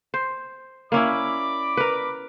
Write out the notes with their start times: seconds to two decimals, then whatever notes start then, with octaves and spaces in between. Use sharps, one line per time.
0.14 C5
0.92 A#3 C#4 E4 D5 B5 D6
1.77 A#4 B4